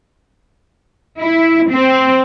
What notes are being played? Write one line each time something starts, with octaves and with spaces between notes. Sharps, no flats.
E4
C4